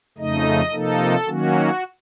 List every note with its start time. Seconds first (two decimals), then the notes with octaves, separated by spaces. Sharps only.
0.18 F2 C#3 A3 D#4 D#5
0.72 C3 F3 A#3 D#4 A4
1.26 D#3 F#3 A#3 C#4 F#4